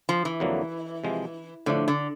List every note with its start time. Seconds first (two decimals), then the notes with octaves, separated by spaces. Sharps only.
0.09 F3
0.25 E3
0.40 F2 D3 F#3 A#3
1.04 C3 F3 G#3
1.66 A2 D3 F3 A3 D4
1.88 D3